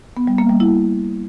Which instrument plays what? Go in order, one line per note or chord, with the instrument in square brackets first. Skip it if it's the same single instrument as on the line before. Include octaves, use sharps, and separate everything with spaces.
[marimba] B3
G3
A#3
G3
E4